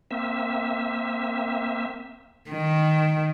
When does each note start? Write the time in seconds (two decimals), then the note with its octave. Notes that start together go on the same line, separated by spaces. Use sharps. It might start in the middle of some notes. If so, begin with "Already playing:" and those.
0.11 A#3 C4 E5
2.50 D#3